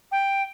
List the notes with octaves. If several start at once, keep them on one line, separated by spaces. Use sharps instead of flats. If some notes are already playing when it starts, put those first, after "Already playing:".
G5